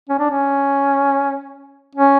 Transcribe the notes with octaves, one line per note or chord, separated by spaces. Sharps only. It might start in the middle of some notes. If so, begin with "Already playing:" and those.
C#4
D4
C#4
C#4